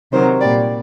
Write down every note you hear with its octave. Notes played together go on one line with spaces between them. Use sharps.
C3 D#3 F#3 C5
A#2 G3 D5